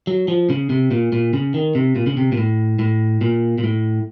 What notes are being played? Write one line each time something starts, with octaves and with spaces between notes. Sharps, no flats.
F#3
F3
C#3
C3
A#2
A#2
C#3
D#3
C3
A#2
C#3
C3
A#2
A2
A2
A#2
A#2
A2